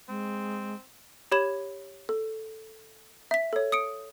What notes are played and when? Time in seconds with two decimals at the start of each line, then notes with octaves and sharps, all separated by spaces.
0.08 G#3 C4
1.32 G4 C#5 B5 G#6 E7
2.09 A4
3.31 E5 B6
3.53 A4 C#5
3.72 D#6 C#7 D7